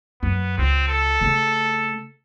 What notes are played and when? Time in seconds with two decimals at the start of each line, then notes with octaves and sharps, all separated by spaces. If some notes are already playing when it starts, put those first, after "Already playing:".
0.23 F#2 B3
0.58 C#2 C4
0.89 A4
1.21 C#3 A3